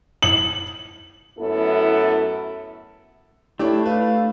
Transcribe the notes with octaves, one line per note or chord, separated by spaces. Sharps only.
F#7
F#2 A2 B3 E4 A4
A3 D4 E4 G4 C#5
B4 F5